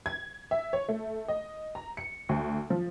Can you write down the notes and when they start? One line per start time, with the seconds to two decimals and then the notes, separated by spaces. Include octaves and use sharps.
0.06 G#6
0.51 E5
0.73 C#5
0.89 A3
1.28 D#5
1.75 A#5
1.97 C#7
2.29 D2
2.70 F3